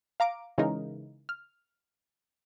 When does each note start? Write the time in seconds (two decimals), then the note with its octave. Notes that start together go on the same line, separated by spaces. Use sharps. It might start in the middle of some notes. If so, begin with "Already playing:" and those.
0.20 F5 A#5 D6 D7
0.58 C#3 E3 G#3 D#4 A#4
1.29 F6